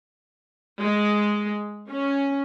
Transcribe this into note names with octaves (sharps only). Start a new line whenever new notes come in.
G#3
C#4